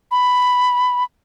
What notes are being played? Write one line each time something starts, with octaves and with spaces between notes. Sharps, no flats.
B5